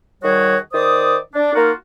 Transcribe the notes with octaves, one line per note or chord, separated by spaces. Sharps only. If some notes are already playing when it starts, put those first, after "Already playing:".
D#3 G3 F#4 G#4 C#5
D#3 C5 D5 D#6
D4
A#3 D#4 F4 F#4 A#4